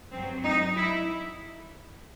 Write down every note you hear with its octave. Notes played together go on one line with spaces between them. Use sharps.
G2 F#3 C4
D#4
E4